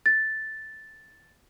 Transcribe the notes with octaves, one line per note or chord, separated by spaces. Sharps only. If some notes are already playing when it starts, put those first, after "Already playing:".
A6